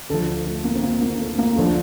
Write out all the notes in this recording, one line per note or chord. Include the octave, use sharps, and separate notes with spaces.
D2 D3 F3 A4
A3
A#3
C4
A#3
A#3
A3
A#3
D2 D3 F3 A3